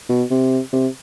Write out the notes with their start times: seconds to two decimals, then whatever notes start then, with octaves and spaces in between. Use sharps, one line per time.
0.09 B2
0.31 C3
0.73 C3